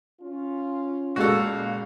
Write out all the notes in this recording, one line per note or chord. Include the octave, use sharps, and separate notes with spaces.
C#4 F4
C#2 A#2 G#3 F#4 A4 F5